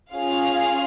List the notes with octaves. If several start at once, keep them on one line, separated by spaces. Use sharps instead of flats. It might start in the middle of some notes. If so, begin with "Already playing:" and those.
C#4 F4 G#4 F5